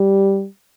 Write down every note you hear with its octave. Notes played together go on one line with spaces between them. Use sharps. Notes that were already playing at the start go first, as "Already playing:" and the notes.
Already playing: G3